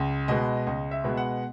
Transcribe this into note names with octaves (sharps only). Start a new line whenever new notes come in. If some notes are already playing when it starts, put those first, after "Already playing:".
Already playing: C#2
B2 G#3 B3 D#5
C#2 D#5
E5
B2 G#3 B3
F#5